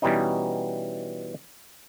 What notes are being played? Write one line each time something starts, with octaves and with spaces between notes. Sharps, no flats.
B2 E3 G3 B3 C#4 D#4